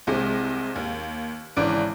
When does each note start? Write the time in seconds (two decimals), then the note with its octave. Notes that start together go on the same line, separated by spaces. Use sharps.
0.07 C2 C3 G#3
0.76 D#2
1.56 G#1 C#3 E3 D5 D7